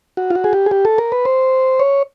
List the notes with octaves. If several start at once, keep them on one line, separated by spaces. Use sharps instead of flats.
F#4
F4
F#4
G#4
G4
G#4
G4
A4
A#4
B4
C5
C#5